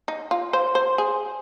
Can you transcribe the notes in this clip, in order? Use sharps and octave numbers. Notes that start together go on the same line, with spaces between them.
D#4
F4
C5
C5
G#4